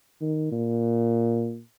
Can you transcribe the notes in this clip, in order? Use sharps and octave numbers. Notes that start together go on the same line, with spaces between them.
D#3
A#2